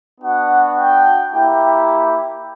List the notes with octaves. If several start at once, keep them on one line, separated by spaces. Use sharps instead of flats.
B3 D4 F#4 F#5
G5
A#3 E4 G4 G5